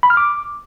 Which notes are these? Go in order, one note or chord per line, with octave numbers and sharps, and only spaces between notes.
B5
F6
D6